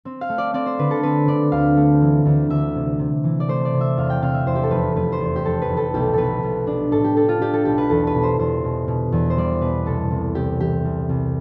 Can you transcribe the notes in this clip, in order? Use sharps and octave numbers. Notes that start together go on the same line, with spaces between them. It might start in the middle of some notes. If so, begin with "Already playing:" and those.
C4
F5
A3
D5
C4 D5
C5
D3 B4
A4
C4 B4
D3 D5
D2 F5
A3
E3
D2
D2 E5
C3
C3
E3
D5
A3 C5
D5
C3
E5
E2 F5
G5
C3 F5
E5
E2 C5
G4
A4
F1 B4
F1 B4
C5
E2
G4
F1 A4
B4
F1
A4
B1 G4
B1 A4 B4
B1
D4
A2 A4
G4
D4 A4
F4
D4 G4
A4
B1 G4
B4
E2 A4
B4
B2
C5
E2 C5
B2
B2
E2
C5
G3 D5
B2 B4
C2 A4
C2
C3 G4
E3 G4
C2
C2